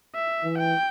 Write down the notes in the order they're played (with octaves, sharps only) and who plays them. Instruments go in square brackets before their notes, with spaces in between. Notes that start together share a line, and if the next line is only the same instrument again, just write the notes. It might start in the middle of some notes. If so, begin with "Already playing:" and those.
[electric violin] E5
[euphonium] E3
[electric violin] G5